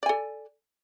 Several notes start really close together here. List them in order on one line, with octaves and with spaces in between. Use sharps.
D5 G#5 A4